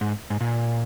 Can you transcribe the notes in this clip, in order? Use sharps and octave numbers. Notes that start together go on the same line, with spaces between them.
G#2
G#2
A#2